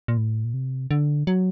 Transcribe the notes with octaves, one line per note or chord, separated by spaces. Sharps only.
A#2
A2
A#2
C3
D3
F#3